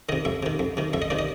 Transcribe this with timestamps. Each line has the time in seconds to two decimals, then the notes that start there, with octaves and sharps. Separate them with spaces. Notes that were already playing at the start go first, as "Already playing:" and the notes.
0.09 C3 D#3 D#5
0.25 F2 E5
0.43 C3 D#3
0.59 F2
0.77 C3 D#3
0.93 F2 E5
1.02 D#5
1.10 C3 D#3 D5
1.19 D#5